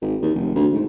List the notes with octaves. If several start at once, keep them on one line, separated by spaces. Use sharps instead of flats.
G#1
D#2
F1
D2
G#2